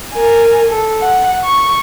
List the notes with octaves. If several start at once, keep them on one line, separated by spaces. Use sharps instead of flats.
A#4 G#5
A4
F#5
C#6